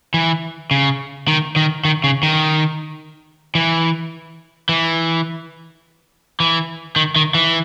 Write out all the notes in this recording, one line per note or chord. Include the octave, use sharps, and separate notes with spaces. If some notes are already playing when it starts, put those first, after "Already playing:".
E3
C#3
D#3
D#3
D#3
C#3
D#3
E3
E3
E3
D#3
D#3
E3